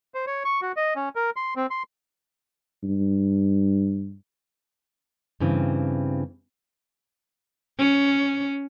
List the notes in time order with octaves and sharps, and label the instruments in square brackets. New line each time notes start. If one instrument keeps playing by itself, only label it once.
[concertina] C5
C#5
C#6
F#4
D#5
C#4
A#4
C6
C4
C6
[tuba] G2
[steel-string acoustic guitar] G2 C#3 E3 C4
[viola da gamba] C#4